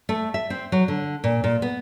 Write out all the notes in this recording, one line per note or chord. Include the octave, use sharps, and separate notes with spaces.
A3
E5
C4
F#3
D3
A#2
A#2
B3